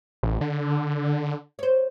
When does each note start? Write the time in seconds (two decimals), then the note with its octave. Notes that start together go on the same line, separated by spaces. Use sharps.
0.23 A1
0.41 D3
1.59 C5 C#5